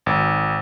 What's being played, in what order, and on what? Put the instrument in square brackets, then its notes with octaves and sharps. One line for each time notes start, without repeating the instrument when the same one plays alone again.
[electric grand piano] G#1